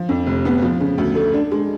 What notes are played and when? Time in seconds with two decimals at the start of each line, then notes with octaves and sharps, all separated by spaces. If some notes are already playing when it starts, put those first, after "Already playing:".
Already playing: F3
0.09 F2
0.26 F1
0.45 B3
0.62 F3
0.80 C#3
0.98 D2
1.15 A3
1.34 D4
1.52 G#3